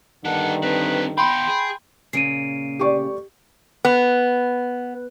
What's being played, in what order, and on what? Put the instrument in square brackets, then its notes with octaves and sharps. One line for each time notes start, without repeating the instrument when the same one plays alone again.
[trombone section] G2 D3 D#3 [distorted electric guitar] G3 A4 [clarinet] F#5
[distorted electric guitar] C4 D4 [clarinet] B4
[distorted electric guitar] B3 F4 [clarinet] G5 [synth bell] B5 C6
[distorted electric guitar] G#4
[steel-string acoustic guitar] A#2 C#3 [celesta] C7 D7 D#7
[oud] D2 G3 D5 [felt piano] G4 C#6
[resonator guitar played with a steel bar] B3